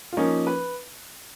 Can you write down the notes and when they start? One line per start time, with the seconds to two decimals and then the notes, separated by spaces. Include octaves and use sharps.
0.13 F4
0.17 F3 A#3 C#4 D#4
0.47 B4